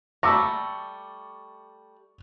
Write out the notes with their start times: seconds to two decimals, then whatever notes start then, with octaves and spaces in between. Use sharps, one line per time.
0.23 G3 A3 A#3 C#6 D6 E6 A#6